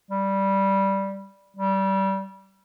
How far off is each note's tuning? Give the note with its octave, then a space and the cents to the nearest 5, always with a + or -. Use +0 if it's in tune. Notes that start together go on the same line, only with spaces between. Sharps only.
G3 -5
G3 -20